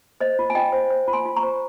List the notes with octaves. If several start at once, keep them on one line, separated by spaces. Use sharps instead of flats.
C5 D#5
F4
G#5
F4 D#5 G5
C5
C5
F4
G#5 C6
F4
A#5 C#6
C5